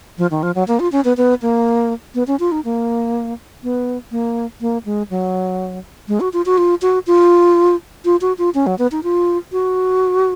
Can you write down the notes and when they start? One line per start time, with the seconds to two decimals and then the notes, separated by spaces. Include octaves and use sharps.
0.18 F3
0.31 D#3
0.43 F3
0.55 F#3
0.68 A#3
0.80 F4
0.92 C#4
1.05 B3
1.17 B3
1.42 A#3
2.15 B3
2.27 C#4
2.40 F4
2.52 D#4
2.65 A#3
3.63 B3
4.11 A#3
4.61 A#3
4.85 G#3
5.10 F#3
6.08 G#3
6.20 F#4
6.33 F4
6.46 F#4
6.58 F4
6.82 F#4
7.07 F4
8.05 F4
8.21 F#4
8.38 F4
8.55 C#4
8.67 F#3
8.79 B3
8.92 D#4
9.03 F4
9.52 F#4